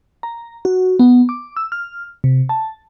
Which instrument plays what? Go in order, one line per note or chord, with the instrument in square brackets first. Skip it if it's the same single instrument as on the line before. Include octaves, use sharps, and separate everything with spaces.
[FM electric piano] A#5
F#4
B3
D6
E6
F6
C3
A5